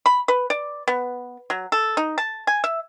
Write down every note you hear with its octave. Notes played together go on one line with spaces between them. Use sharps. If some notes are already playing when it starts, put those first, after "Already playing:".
B5
B4
D5
B3
F#3
A4
D#4
A5
G#5
E5